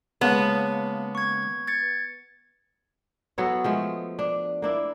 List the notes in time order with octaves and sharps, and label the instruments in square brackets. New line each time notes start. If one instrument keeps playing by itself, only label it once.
[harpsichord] C#3 G#3 A#3 [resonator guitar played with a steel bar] B3 [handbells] F5 A5
[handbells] C#6 G#6
G#6 A6 C#7
[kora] F#3 B3 A4 C#5
F3 G#3 A3
D4
A#3 D4 E4